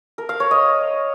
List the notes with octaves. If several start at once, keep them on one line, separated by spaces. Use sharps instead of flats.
A#4
F5
C#5
D#5